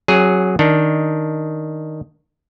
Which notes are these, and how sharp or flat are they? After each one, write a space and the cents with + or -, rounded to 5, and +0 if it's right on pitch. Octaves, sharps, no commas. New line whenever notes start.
F#3 +0 C#4 -35 G#4 +0
D#3 +0 D4 +0